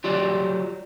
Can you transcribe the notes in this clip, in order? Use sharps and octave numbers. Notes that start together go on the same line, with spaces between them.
F#3 F4 G4 D5